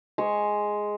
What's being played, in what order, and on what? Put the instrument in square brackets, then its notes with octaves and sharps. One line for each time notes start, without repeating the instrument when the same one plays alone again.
[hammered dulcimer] G#3 C#6